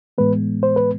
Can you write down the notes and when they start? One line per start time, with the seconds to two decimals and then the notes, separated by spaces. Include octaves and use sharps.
0.18 A2 E3 G#3 B3 B4
0.63 C5
0.76 B4